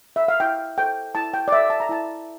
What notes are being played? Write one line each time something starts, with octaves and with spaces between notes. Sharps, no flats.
E5
F5
E4 G5
A4 C5 G5
E4 A5
G5
D5
A4 C5 E5
A5
A#5
E4 A5